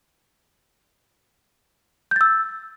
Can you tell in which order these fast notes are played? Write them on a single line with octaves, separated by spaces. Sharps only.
G6 A6 E6